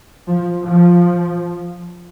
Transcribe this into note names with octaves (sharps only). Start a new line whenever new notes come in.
F3
F3